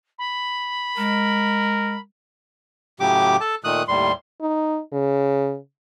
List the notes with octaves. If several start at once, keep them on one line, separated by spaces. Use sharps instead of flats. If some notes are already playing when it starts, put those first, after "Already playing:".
B5
G#3 A#4
A2 C#3 F#3 G4 D6
A4 A5
A#2 D#3 A3 D#6 F#6
D#2 A2 G3 C6
D#4
C#3